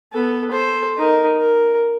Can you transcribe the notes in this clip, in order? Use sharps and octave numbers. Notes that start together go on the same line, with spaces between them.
B3 A4
A4 C5
D#4 A#4
A#4